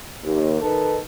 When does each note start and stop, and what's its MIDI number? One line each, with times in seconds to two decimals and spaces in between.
0.24 0.59 39
0.62 0.98 51
0.62 0.98 63
0.62 0.98 69
0.62 0.98 71